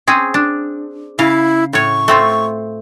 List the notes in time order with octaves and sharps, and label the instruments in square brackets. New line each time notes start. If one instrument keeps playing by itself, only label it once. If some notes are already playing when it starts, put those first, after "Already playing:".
[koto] C4 C#4 G#4
D4
[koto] C#3 F5 [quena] E4
[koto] A2 C#5 [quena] C#6
[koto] A3 C4 F4